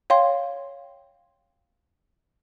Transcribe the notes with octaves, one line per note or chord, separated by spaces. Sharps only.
C#5 F5 G5 C6